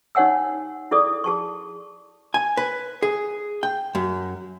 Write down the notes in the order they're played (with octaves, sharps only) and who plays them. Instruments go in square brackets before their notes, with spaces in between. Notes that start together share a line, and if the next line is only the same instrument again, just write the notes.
[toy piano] D#4 G4 C#5 F#5 G#5 E6
E4 G#4 A4 D5 D#6
G#4 A5 C#6
[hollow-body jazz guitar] G#5
B4
G#4
G5
F#2